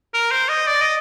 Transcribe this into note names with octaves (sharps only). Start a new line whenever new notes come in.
A#4
C5
D#5
D5
D#5